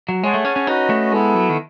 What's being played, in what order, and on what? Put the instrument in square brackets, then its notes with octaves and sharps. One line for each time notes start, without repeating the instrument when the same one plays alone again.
[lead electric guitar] F#3
[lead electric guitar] G#3 [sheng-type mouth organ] G#4 C#5 F#5 A5
[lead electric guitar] A3
C#4
C#4
[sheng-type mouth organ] C#4 F#4 B4 D#5 [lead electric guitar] D#4
[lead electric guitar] A3
[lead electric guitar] G#3 [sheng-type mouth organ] B3 E4 A4
[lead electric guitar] F#3
D#3